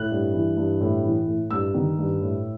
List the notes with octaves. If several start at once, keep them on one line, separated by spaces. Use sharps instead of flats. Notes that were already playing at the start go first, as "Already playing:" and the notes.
Already playing: A2 F#6
G2
E3
G2
A2
E3
A2
G2 E6
D#3
G2
A2